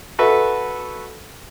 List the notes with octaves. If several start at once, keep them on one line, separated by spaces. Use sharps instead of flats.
F#4 A4 B4 E5